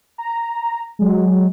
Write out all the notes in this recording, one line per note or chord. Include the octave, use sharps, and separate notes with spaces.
A#5
F#3 G#3